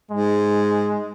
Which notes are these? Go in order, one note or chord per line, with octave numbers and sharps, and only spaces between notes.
G#2 G#3